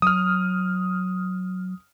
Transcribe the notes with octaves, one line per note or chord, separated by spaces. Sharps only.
F#3 D#6 F6